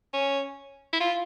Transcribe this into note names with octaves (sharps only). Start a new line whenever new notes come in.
C#4
E4
F4